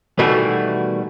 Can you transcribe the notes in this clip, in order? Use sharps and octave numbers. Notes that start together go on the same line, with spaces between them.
B2 D#3 E3 G3 A3 F#4